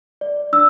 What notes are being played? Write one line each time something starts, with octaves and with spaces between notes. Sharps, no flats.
D5
D4 E6